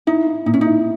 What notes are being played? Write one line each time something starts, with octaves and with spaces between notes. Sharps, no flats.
D#4 E4
E4
A#2 D#4
C#4
D#4
E4